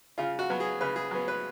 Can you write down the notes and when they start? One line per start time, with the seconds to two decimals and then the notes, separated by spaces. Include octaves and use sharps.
0.18 C#3 F4
0.39 F#4
0.50 F#3 B3
0.60 G#4
0.81 C#3 B4
0.96 G#4
1.11 F#3 B3
1.28 B4